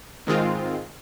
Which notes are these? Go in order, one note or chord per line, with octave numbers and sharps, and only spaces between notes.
G#2 D#3 G#3 C4 F4